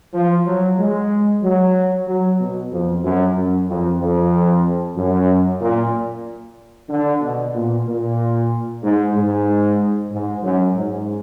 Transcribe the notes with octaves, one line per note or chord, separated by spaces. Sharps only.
F3
F#3
G#3
F#3
F#3
B2
F2
F#2
F#2
F2
F2
F#2
A#2
D3
B2
A#2
A#2
G#2
G#2
G#2
F#2
G#2